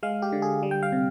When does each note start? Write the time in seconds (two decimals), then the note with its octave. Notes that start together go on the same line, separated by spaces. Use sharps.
0.03 G#3 F5
0.22 G4
0.32 D3
0.42 G#4
0.63 G3
0.71 G5
0.83 F5
0.92 C3